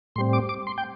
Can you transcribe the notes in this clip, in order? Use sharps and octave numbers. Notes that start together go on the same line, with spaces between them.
A2 G3 C4 C6
D6
D6
C6
G5